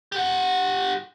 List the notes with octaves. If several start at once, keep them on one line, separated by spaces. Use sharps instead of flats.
G4 F#5